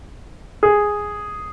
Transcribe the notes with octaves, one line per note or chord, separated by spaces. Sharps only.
G#4